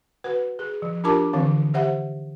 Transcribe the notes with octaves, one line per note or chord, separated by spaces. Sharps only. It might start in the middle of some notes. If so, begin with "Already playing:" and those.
F#4 B4 F#5
G#4
F3
D4 F4 G4 A#4 A5 D6
D3 E3 C4 F5
G4 C5 E5 F#5